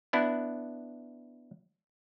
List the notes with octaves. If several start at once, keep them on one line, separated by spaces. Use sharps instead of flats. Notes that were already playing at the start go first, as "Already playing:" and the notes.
B3 D4 E4